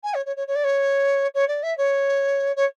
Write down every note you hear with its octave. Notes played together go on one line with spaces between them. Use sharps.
G#5
C#5
C#5
C#5
C#5
D5
C#5
C#5
D5
E5
C#5
C#5